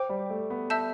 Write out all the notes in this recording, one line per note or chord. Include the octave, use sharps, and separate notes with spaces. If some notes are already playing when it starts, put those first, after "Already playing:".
Already playing: C5 G5 D6
G3
A3
B3
E5 A5 E6 G6